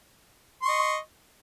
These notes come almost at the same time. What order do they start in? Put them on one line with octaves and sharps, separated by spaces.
C6 C#6 D#5